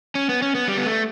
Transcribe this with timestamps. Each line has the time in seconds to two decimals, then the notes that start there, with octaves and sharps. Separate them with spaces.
0.15 C#4
0.29 B3
0.42 C#4
0.55 B3
0.68 G3
0.77 B3
0.86 A3